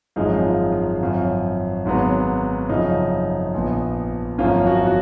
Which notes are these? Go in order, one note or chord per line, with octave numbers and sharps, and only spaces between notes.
G#1 F#2 F3 G#3 D#4
F4
F4
G#1 F#2 F3 F4
G#1 G#2 F#3 B3
F#2 C#3 F3 D#4
A#1 A#2 F3 B3
G#1 F#2 F3 A#3 C#4 F4
F#4
F#4